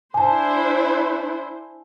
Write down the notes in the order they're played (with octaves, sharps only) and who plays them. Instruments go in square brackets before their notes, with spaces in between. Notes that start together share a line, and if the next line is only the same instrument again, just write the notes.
[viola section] D4 E4 C5 [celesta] G#5 A5